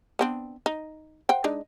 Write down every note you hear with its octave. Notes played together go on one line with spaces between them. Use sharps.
B3 C4 D4
D#4
C5 F#5 G5
G#3 D4 D#4